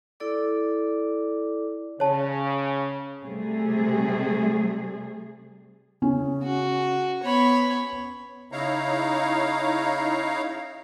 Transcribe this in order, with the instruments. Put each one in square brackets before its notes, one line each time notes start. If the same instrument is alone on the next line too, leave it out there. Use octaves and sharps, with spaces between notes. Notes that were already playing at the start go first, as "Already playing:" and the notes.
[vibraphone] E4 A4 D5 D6
[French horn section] C#3 [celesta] C#5 A5
[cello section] C3 G3 A3 G#4
[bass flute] C#3 [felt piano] C#4
[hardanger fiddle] F#4
[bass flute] B3 [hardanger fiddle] C#5 B5
[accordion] C#3 D#4 E4 C#5 F5 A#5